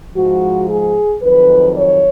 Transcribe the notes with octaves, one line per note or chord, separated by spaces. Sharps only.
G#2 F3 G#3 F#4
G#4
F2 D#3 F#3 B4
C#5